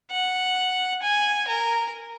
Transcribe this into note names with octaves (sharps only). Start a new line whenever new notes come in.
F#5
G#5
A#4